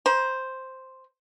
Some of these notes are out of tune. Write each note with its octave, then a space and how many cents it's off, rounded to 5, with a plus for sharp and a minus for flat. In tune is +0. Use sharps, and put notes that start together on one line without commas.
C5 +0 A#5 +40